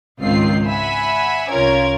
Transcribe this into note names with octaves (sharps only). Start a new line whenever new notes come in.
G#1 C#2 D#3 C4 F4 C7
E5 F#5 G#5 B5
C2 C#4 F4 A#4 G#6